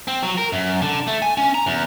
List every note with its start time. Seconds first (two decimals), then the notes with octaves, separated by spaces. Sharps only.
0.08 C4
0.23 F#3
0.38 A#4
0.53 F#2
0.82 D3
1.07 A3
1.22 G#5
1.37 C#4
1.55 A#5
1.67 E2